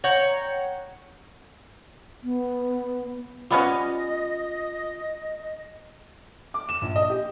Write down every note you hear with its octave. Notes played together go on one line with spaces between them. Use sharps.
C#5 F#5 G5 A#5
B3
G3 B3 C#4 F4 D#5
D6
E7
A#1
D#5
G4